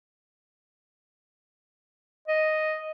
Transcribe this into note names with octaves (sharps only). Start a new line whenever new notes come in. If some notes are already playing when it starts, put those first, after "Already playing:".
D#5